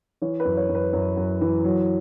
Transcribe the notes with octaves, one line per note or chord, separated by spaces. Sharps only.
E3 C#5
B4
F#2
C#5
F#2
B4
F#2 C#5
F#2
E3
F#3